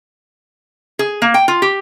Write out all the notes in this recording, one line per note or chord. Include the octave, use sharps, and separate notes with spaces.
G#4
A#3
G5
F4
G4